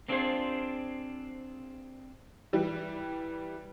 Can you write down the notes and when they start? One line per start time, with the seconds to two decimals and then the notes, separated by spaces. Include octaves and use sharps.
0.08 A#3 C4 D4 F4 G#4 C5
2.53 E3 G3